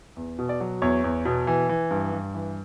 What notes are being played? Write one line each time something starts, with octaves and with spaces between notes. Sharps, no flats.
E2
B2
D5
F#3
E2 C#5
E2
B2
E3
E3
G2
G2
E3